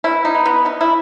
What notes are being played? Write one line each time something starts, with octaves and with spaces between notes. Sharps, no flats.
E3 E4
D#4
B3
B3
E3 D#4
E4